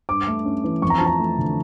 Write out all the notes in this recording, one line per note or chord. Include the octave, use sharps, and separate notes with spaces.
G2 D6
A3
C#4
E3
F2 C#6
A#5
F3 A5
A#5
A3
D3